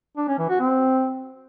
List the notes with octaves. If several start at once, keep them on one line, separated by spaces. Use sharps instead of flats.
D4
C#4
E3
F#4
C4